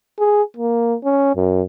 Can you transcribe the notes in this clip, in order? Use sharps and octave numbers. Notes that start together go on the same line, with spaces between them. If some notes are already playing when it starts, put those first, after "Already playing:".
G#4
A#3
C#4
F#2